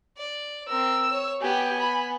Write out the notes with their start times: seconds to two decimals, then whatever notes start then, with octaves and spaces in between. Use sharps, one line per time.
0.17 D5
0.68 C4 A#4 E6
1.10 C#5
1.41 B3 G4 G#5
1.80 B5